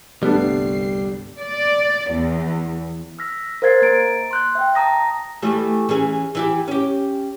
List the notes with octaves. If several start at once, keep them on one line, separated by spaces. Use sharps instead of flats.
G1 C2 G3 A3 B3 D4 C7
D5
E2
E6 F6 A#6 B6
A#4 C5 F5 G#6 A6 C7
A#3 A#5 A6 D7
C6 F#6 G6
E5 G5
A5 A#5 D#6 A#6
E3 G3 A3
E3 C#4 G#4
E3 E4 G4
C#4 G4